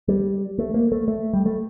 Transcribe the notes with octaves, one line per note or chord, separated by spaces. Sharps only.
G3
A3
A#3
A3
A3
G3
A3